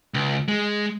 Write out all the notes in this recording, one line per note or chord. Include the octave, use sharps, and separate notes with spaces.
C#2
G#3